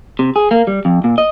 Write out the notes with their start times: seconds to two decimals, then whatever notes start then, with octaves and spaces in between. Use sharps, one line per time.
0.19 C3
0.36 G#4
0.51 A#3
0.67 G3
0.85 F2
1.04 A#2
1.18 D#5